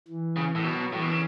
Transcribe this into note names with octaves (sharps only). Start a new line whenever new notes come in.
E3
C#3
A2
B2 F#3
A2 E3
B2
C#3